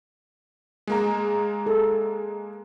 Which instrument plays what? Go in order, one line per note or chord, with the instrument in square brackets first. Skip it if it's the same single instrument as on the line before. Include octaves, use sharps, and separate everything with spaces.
[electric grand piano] G#3 A#3 A#5
[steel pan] A4